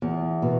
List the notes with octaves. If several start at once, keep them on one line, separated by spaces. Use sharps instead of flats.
E2
B2